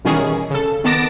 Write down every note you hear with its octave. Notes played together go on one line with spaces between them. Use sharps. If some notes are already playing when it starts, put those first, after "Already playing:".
B2 D#3 E3 G3 C#4 G#4
C#3 A4
D#3 B3 A5 D6 A#6 D7